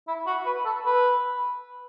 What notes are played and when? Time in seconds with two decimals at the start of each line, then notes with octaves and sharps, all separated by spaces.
0.08 E4
0.26 F#4
0.46 B4
0.65 A4
0.85 B4